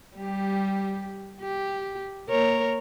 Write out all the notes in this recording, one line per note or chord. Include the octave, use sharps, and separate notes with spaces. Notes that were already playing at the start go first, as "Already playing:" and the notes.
G3 G4
G4
A#3 A#4 C#5